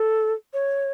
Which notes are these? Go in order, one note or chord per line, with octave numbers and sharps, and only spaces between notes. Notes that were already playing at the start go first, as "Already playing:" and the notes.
Already playing: A4
C#5